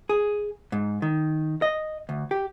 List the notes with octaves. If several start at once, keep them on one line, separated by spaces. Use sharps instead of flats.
G#4
G#2
D#3
D#5
D2
G4